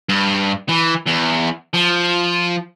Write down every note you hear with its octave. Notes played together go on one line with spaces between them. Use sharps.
G2
E3
E2
F3